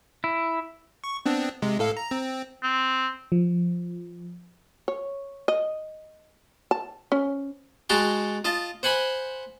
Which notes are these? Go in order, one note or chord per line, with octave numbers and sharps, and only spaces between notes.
E4
C#6
B3 C4 D4
C3 G#3
A2 A4 F5
A#5
C4
C4
F3
C#5
D#5
A5
C#4
G#3 F#4 G5 A5 A#5 C6
F4 D#5 A5
C5 F#5 G#5 B5 C6